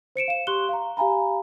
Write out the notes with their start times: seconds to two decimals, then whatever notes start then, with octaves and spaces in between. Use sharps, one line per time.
0.16 C5 C#7 D7 E7
0.28 F5 E7
0.47 G4 C6 C#6 F#6 G7
0.69 F5 A#5
0.97 G4 F5 G#5 A#5 B5